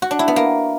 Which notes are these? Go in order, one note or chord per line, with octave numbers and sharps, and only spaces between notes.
F#4
D4
E4
B3
A#3